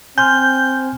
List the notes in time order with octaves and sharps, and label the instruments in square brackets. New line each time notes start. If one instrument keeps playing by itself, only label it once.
[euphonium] C4 [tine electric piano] G#5 C6 F6 [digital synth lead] G6